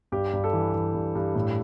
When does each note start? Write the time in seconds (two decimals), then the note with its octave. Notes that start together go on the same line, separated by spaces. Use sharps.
0.12 G2 G4
0.33 G2
0.44 A4
0.53 E3
0.74 E3
0.94 G2
1.15 G2
1.35 A2